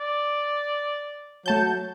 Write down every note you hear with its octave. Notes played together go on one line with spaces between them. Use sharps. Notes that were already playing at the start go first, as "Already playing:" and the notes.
D5
F#3 A3 A5 G6